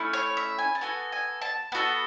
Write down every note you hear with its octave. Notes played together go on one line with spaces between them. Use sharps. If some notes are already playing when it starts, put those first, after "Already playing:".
Already playing: A3 C#4 E4
C#5
E5
G#5
A5
B3 F#4 A4 G#5
G#5
A5
B3 F#4 A4